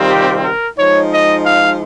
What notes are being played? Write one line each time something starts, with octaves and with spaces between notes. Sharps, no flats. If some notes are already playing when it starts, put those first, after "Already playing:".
Already playing: C3 D#3 G3 C4 F4
G4
A#4
F3 G#3 D#4 C#5
D#5
F5